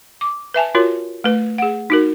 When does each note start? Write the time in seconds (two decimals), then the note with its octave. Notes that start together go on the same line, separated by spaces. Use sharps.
0.21 D6
0.54 B4 E5 G#5 A5
0.75 F4 F#4 A#4 C#5
1.24 A3 B4
1.58 G#4 F#5
1.90 D#4 F#4 A#4